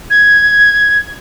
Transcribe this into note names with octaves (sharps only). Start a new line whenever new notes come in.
G#6